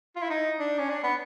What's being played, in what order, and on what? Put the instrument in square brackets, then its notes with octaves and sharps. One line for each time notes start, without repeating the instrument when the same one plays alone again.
[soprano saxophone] F4
E4
D#4
D4
C#4
D4
B3